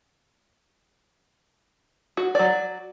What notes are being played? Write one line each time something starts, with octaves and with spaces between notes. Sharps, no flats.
F#4
F#3 D5